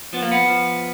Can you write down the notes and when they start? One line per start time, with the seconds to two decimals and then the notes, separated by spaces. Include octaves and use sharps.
0.13 F3 B3
0.22 A#3
0.31 B3
0.46 F3